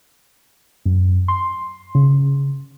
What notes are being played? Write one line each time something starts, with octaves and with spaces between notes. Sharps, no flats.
F#2
C6
C#3